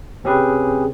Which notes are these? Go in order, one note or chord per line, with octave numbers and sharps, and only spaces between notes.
C3 C4 C#4 G4 G#4 B4